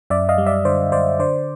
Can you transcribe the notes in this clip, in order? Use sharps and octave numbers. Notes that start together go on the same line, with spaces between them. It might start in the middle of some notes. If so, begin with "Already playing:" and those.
F#2 D5 E5
D#5 F5
G3
D5 E5
D3 C5 D5
F#2 C5 D5
D3 C5 D5